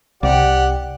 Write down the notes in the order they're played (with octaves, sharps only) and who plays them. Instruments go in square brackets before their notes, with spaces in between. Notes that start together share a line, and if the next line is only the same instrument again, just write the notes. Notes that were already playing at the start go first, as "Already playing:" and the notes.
[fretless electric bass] C2 [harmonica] G4 D5 F#5